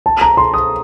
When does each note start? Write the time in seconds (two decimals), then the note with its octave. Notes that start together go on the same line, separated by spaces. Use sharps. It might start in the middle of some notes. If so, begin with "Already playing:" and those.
0.06 A5
0.21 A#5
0.37 C6
0.54 D#6